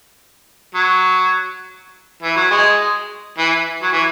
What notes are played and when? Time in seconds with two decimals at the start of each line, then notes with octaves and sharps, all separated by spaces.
0.75 F#3
2.22 E3
2.36 F#3
2.50 G#3
3.38 E3
3.82 F#3
3.93 E3